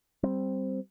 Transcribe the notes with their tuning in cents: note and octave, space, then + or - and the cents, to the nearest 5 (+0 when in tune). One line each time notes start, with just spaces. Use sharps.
G3 +0 C4 +0